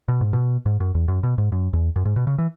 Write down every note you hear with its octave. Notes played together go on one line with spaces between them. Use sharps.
B2
G#2
B2
G#2
F#2
E2
F#2
B2
G#2
F#2
E2
F#2
G#2
B2
C#3
E3